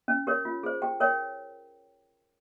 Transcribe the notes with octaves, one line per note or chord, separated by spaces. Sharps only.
C#4
G4 A#4 C#5
F4
G#4 C5
G4 G5
A#4 C#5 G5